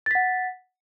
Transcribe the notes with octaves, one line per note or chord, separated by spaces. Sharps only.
F#5 A6 B6